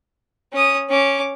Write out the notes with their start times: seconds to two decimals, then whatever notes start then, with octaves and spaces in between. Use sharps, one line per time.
0.53 C#4 D#6
0.89 C#4 D6